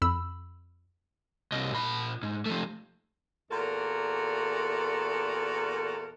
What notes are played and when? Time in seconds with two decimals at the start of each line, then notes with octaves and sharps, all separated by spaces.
0.02 F2 B5 E6
1.52 C2 D#5
1.73 A#2 B5
2.23 G#2
2.46 F3 A3
3.51 E2 A#2 F#4 A4 A#4